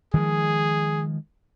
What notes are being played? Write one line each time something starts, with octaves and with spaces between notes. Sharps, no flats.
D#3 F3 G#3 G#4